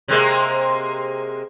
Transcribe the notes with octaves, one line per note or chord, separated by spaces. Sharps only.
C3 G#3 A#3